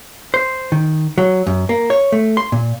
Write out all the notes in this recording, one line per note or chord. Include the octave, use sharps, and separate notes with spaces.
C5
D#3
F#3
F#2
A#3
C#5
A3
C6
A#2